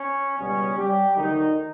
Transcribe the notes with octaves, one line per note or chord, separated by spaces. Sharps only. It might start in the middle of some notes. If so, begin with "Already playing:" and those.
Already playing: C#4
C#2 B2 G3 B3 C#4
G3 G4
D2 D3 D#3 F#3 D#4